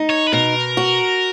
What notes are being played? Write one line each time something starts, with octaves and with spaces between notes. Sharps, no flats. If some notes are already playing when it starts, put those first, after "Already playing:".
Already playing: D#4
C#5
B4
B2 A#4
F#4